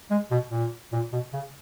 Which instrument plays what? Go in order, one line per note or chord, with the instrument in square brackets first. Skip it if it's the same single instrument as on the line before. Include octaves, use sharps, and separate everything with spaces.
[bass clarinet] G#3
B2
A#2
A#2
B2
C#3